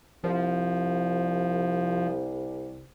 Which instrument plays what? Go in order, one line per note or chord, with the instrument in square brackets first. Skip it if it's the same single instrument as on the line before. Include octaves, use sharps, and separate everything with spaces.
[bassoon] C2 [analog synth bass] F3